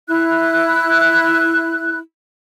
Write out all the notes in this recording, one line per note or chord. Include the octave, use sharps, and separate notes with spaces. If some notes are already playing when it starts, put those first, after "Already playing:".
E4 F#6